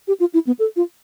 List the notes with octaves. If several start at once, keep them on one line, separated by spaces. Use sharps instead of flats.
G4
F4
E4
B3
A4
F4